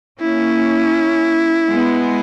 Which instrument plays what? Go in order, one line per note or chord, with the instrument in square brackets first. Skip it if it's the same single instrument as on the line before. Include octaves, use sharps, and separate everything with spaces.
[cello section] A#3 C#4 [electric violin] E4
[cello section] G#3 B3